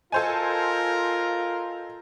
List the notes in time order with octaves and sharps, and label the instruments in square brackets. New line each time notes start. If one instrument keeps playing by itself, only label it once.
[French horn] F4 [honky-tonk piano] A4 C5 G#5 [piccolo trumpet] A#4 [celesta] D#5 G6